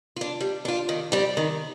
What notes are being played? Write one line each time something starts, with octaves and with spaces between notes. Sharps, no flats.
D4 F4
G3
D4 F4
D#3
G3 C4 G4
D#3